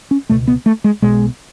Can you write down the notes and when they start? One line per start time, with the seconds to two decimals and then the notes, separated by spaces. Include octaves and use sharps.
0.11 C#4
0.29 C#2 B2 A3
0.47 B3
0.66 A3
0.84 G#3
1.02 B1 B2 G#3